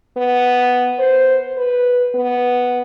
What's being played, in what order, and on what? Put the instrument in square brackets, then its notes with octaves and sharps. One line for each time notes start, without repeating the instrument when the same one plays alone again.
[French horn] B3
C5
B4
B3